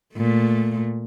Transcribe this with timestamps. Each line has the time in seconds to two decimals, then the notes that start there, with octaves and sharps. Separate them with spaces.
0.15 A#2 A3